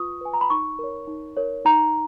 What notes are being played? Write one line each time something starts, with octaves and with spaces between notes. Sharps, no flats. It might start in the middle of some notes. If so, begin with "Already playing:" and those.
Already playing: F4 B4 C#6 D#6
B4 G#5
A#5
B5
D#4 C#6
A#4 C#5
D#4
A#4 C#5
D#4 A#5